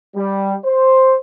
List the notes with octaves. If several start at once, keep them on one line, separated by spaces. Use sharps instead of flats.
G3
C5